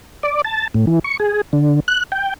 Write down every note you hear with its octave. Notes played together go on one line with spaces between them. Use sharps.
D5
A5
A2
E3
C#6
G#4
D3
F#6
G5